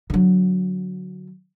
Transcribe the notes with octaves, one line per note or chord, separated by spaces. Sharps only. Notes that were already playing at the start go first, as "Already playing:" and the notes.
D3 F#3